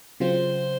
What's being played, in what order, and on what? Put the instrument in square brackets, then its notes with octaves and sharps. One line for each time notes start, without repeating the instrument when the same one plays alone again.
[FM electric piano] C#3 F#3 C4 F4 [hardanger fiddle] C5